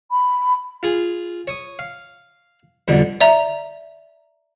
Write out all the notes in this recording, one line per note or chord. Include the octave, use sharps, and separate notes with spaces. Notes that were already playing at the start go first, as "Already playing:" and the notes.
B5
F4 G#4
C#5 D#6
F5
F2 B2 D3 G3
D5 E5 A#5